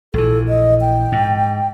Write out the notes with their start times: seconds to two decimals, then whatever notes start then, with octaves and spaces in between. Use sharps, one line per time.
0.14 A#1 E3 A4
0.48 D#5
0.81 G5
1.12 G#2